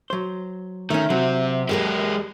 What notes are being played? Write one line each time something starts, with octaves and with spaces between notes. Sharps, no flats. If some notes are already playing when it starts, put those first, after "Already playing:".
F#3 C5
D#3 A3 C#4 E5
C3 F#3 C4
D#2 G#3 G4 G#4 A#4